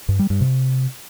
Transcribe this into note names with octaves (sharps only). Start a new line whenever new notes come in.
G2
G3
G2
C3